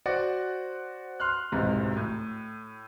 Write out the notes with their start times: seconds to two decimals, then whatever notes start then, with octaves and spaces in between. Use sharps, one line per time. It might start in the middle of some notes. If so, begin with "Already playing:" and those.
0.06 F#4 C5 D5 F#5
1.20 C6 F6 F#6
1.52 D1 B1 G#2 C3
1.97 A2